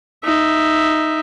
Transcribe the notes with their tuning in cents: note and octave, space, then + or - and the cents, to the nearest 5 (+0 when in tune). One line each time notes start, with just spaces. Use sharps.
D#4 +0 E5 +0